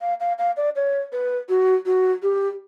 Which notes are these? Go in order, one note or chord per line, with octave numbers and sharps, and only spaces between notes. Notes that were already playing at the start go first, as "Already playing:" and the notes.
F5
F5
F5
D5
C#5
B4
F#4
F#4
G4